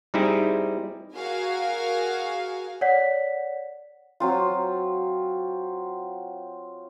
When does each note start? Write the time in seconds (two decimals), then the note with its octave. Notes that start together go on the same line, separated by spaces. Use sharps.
0.14 G3 C4 D#4 E4 G4 G#4
1.15 F#4 G#4 A#4 F5 G#5
2.81 C#5 D5 F#5 B6
4.20 F#3 C4 F4